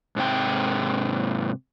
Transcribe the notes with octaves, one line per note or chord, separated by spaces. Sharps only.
G#2 C3 G5